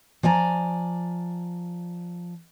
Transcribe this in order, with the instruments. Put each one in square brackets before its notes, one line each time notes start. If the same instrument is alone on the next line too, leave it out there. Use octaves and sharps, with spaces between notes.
[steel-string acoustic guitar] F3 D5 G#5 A#5